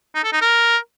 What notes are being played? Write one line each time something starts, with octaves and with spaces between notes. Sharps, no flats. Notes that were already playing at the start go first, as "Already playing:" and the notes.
D#4
A4
D#4
A#4